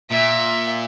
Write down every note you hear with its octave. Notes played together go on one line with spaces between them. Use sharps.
A#2 E5